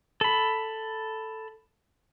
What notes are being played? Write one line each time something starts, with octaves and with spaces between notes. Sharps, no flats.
A4 B5